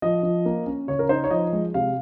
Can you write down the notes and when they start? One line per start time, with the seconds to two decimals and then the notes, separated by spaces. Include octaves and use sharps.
0.02 F3 D#5
0.23 F3
0.46 A#3
0.66 C#4
0.88 C#3 C#5
0.99 A#4
1.09 D#4 C5
1.24 C#5
1.31 F3 D#5
1.53 G#3
1.74 C3 F5